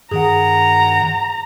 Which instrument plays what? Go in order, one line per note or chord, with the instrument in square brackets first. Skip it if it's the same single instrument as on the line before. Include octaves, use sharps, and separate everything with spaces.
[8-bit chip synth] G2 D#3 F#5 [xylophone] G#4 [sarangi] A#5